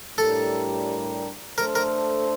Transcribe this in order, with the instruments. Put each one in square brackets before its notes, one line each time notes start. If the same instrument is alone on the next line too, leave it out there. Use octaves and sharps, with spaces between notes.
[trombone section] A2 G3 D4 G4 A#4 [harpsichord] A4
[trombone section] A3 D4 A4 C5 [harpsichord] A#4
[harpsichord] A#4